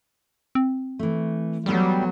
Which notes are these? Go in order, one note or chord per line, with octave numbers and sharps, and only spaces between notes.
C4
E3 A3
F#3 G3 B3 A4 C5